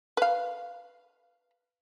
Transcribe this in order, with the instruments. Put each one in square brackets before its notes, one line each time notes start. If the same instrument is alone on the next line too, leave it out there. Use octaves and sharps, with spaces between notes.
[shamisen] B4 F5